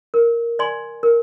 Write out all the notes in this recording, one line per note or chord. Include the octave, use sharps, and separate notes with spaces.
A#4
D5 G#5 C6
A#4